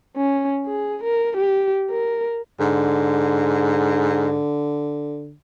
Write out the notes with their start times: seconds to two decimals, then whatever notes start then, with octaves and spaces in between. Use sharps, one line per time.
0.17 C#4
0.66 G#4
1.04 A#4
1.37 G4
1.90 A#4
2.60 G#2 D3